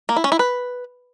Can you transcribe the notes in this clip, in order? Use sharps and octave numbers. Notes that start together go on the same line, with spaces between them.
A#3
E4
C#4
E4
B4